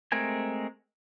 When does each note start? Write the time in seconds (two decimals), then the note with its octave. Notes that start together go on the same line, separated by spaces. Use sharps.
0.12 G#3 A3 C4 A#4 G#5